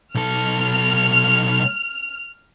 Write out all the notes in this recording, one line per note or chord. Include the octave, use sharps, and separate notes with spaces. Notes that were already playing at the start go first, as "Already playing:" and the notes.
B1 A4 F6